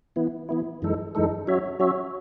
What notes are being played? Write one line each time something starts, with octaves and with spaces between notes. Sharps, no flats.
E3 B3 E4
E3 B3 E4
F#2 E3 G#3 D#4 A4
F#2 E3 G#3 D#4 A4
F#3 C#4 F#4 C#5 E5
F#3 C#4 F#4 C#5 E5